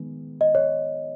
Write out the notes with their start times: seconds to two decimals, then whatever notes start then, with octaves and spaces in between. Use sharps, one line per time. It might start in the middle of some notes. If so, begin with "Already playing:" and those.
Already playing: D#3 G#3 B3
0.41 D#5
0.55 C#5